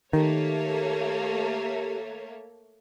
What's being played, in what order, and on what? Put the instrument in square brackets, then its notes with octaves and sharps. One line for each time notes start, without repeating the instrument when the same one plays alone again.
[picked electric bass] D#3 [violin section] A3 A#3 C#5 [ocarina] G4